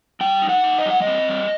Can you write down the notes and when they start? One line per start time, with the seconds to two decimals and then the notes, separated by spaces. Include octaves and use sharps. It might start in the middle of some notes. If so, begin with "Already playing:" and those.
0.21 G3 G5
0.42 D#4
0.49 F#5
0.64 D#4
0.78 D#5
0.86 G3 F#5
1.02 D#5
1.07 C4
1.29 G3